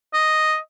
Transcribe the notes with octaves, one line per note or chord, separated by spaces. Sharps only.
D#5